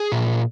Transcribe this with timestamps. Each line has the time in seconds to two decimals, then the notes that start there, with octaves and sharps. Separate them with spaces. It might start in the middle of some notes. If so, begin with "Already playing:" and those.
Already playing: G#4
0.12 A#2